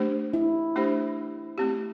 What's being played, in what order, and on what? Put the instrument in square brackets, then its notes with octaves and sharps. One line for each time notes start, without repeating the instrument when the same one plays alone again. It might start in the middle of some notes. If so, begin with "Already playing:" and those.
Already playing: [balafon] A3 D4 G4 C5
[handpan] E4
[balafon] A3 D4 G4 C5
A3 C4 G4